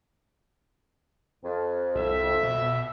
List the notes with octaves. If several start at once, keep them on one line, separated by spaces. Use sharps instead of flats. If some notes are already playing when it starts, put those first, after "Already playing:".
F2
C2 E5
B2